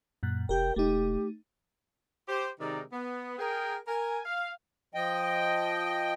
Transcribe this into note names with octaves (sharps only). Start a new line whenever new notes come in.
F#2 A#2 F#6
F1 G4 A#4 G5
E1 A3 D#4 G4
G4 C5
C3 D#3 G#3 D#4 A#4 D5
B3
G#4 A#4 G5
A#4 G#5
F5
F3 D#5 G5